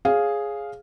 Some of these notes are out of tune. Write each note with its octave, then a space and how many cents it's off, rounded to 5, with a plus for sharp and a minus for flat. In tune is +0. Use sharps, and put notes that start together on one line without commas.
G#4 +0 C#5 +0 F5 +0